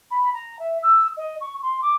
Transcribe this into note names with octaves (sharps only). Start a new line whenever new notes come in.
B5
A#5
E5
E6
D#5
C#6
C6
D6